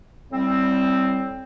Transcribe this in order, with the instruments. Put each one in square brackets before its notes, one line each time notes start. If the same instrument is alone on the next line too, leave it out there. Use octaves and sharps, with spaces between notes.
[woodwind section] A2 G3 C4